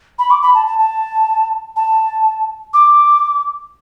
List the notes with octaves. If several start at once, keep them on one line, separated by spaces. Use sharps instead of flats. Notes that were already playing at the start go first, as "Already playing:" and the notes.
B5
D6
B5
A5
A5
A5
A5
D6